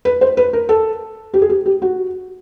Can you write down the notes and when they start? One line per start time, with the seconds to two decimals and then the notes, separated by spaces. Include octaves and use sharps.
0.05 B4
0.21 C5
0.37 B4
0.53 A#4
0.69 A4
1.34 G4
1.42 G#4
1.50 G4
1.66 G4
1.82 F#4